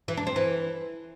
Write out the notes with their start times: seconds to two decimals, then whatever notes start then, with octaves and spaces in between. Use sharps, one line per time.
0.08 E3
0.17 D4
0.27 C4
0.36 E3